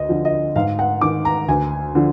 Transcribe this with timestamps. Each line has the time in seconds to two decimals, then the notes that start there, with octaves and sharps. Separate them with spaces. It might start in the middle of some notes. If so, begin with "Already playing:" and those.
Already playing: D2 D#5
0.09 D3 F3
0.25 D#5
0.56 G#2 F5
0.79 F#5
1.01 D#3 D6
1.25 A#5
1.48 D2 G#5
1.95 D3 F3